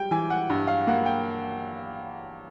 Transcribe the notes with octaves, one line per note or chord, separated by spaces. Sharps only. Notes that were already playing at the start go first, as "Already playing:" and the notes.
Already playing: G3 G5
E3 G#5
F#5
G2
F5
A#3 F#5
G5